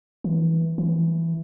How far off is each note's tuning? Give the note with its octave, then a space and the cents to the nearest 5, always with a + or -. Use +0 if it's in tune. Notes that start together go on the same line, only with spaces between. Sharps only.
E3 -15
E3 +5